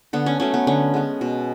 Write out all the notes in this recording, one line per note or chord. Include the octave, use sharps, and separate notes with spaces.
D3 B3
C#4
F#3 A3 C#4
B3
D3 C#4
G#3 B3
B2